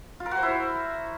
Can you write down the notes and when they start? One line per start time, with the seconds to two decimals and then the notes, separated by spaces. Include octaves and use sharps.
0.20 F4
0.26 A#4
0.31 F#4
0.37 C5
0.43 E4